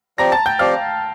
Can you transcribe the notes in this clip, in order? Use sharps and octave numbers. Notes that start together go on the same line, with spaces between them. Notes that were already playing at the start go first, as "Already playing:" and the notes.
F3 C4 G4 D5 A#5 A#6
A5 A6
G5 G6
F3 C4 G4 D5 F5 F6